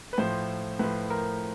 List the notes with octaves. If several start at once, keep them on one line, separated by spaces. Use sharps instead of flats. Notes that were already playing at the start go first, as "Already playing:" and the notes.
B4
A2 F3 C5
A2 F3 B4
A#4